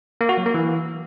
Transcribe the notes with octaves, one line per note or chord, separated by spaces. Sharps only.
A#3
F#4
F#3
A#3
E3